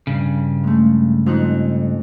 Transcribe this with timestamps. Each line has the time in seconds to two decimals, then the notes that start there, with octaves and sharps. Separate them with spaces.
0.07 G2 C#3
0.63 G#3 A3
1.26 F2 D#4 F#6